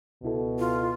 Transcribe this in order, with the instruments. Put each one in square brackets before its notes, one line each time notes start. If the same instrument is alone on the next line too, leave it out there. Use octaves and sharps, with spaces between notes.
[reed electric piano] C#2 E4 A4 [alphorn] B2
[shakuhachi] F4